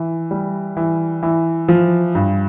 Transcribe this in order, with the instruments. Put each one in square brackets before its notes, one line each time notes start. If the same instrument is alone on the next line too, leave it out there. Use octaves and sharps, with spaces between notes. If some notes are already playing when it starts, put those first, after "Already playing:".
Already playing: [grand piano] E3
G3
E3
E3
F3
G2